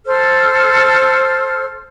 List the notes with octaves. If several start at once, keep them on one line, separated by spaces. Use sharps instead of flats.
A4 C5 F6